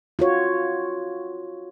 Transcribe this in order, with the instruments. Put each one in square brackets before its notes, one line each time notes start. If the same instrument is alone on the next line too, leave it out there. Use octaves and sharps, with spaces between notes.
[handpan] F4 F#4 C#5